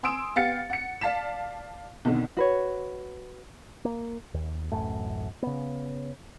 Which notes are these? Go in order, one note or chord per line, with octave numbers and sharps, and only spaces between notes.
G#5 C6 D#6 E6 D7 E7
B3 G4 F5 G5 A6 C#7
F#5 C#7
D5 F5 A5 B6 E7
B1 F2 B2 D3 D#3
F#4 B4 C#5
A#3
D#2
D1 A1 F#2 A3
C#3 B3